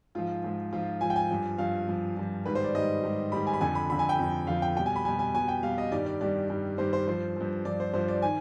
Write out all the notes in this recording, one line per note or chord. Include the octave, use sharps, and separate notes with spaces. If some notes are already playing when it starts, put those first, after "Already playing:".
G#2 F3 F4
G#2 F3
G#2 F3 F4
G#2 F3 G#5
G5
G#5
G2 F3
G2 F3 F5
G2 F3
G2 F3
G#2 D#3 G3 B4
C5
D5
G#2 D#3 G3 D#5
G#2 D#3 G3
G#2 D#3 G3 B5
G#5
B5
F2 D3 F3 G#5
B5
F2 D3 F3 B5
G#5
G5
F2 D3 F3
F2 D3 F3 F5
G5
B2 G3 G5
G#5
B5
B2 G3 G#5
G#5
B2 G3 G#5
G5
B2 G3 F5
D#5
G2 D#3 G3 D5
D5
G2 D#3 G3 D5
G2 D#3 G3
G2 D#3 G3 C5
C5
G2 F3 C5
G2 F3
G2 F3 D5
C5
G2 F3 C5
D5
D#3 G#5